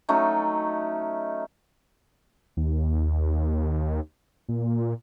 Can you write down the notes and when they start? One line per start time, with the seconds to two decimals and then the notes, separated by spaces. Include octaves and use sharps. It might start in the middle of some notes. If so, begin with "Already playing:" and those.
0.09 F#3 A3 C#4 D#4
2.57 D#2
4.49 A#2